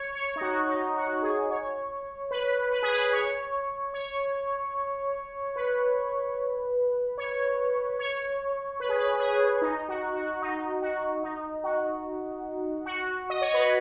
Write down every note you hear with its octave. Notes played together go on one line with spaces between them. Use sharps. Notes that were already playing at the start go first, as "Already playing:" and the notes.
Already playing: C#5
C#5
D#4
F#4
D#4
F#4
G#4
C#5
B4
B4
G#4
B4
C#5
C#5
B4
C#5
C#5
B4
G#4
B4
B4
G#4
D#4
F#4
F#4
D#4
F#4
D#4
F#4
F#4
D#5
C#5
B4